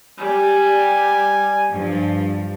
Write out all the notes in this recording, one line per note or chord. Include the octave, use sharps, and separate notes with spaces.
G3 G#5
G2 F3